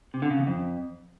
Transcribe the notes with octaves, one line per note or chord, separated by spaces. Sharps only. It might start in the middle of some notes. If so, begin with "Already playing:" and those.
C3
D3
C#3
E2
F2